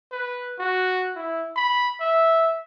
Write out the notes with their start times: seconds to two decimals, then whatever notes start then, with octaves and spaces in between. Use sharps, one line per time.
0.12 B4
0.59 F#4
1.16 E4
1.56 B5
2.00 E5